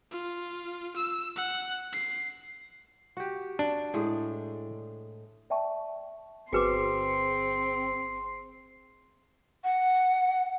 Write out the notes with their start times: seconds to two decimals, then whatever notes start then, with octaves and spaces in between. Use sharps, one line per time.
0.11 F4
0.96 E6
1.36 F#5
1.93 C7
3.17 F#4 G4
3.59 D4
3.94 A2 G#3
5.50 D5 E5 G5 A5 C#6
6.53 G1 C4 F#4 G#4 B4 C6 D6 C#7
9.64 F#5